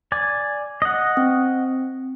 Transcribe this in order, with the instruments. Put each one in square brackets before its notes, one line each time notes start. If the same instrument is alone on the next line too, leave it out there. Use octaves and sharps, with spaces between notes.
[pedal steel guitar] D5 G#5
D#5 F#5
[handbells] C4